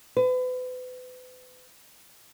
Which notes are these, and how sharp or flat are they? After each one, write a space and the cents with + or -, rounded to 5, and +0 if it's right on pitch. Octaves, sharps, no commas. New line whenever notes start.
B4 +40